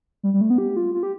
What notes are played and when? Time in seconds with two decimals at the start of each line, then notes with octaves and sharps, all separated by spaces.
0.23 G3
0.34 G3
0.41 A3
0.50 B3
0.58 G4
0.76 F4
0.94 F4
1.03 G4